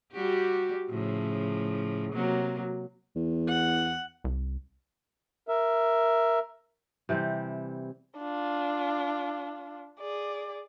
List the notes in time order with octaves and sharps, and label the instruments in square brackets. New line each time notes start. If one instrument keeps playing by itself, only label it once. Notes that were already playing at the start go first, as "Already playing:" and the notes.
[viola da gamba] G3 F#4 G4
A2 C#3 F3
C3 F#3 A#3
[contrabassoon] E2
[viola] F#5
[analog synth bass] C2
[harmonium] A#4 E5
[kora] C3 E3 G3 C4
[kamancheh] D4 F4
G#4 D5